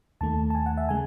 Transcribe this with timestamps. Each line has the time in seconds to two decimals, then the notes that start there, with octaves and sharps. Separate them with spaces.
0.21 D#2 D#3 A3 A5
0.50 A5
0.55 G#5
0.66 F#5
0.77 E5
0.89 C#3 G#3 G#5